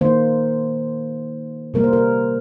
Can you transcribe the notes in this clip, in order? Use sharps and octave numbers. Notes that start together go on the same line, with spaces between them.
D#3 A#3 C5
C3 G3 A#3 A#4
C5
A#4